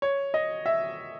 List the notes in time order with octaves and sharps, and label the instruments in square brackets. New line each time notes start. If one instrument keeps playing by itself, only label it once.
[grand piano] C#5
D#5
E5